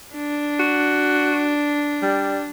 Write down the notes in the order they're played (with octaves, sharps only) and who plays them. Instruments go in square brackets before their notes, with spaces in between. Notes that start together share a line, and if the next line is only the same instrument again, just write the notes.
[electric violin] D4
[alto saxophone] F#4
G3